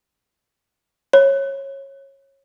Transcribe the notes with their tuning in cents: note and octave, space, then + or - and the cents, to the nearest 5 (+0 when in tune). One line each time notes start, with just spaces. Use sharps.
C#5 -20